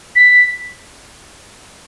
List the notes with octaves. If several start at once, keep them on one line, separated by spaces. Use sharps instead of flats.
B6